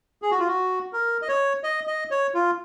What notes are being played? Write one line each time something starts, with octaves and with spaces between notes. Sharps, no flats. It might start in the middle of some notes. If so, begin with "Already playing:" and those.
G#4
F#4
F4
F#4
A#4
D#5
C#5
D#5
D#5
C#5
F4